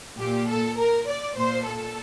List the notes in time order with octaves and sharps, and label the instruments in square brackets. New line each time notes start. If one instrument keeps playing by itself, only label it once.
[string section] A#2 G4
A4
A#4
D5
A#2 C5
A4